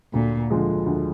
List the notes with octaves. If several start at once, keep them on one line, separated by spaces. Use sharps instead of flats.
D2 A#2
D3 F3 G#3
D2